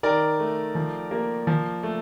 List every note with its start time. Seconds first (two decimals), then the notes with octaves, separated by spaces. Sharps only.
0.03 D#3 A#4 D5
0.39 A3
0.75 F3
1.11 A#3
1.47 F3
1.83 A3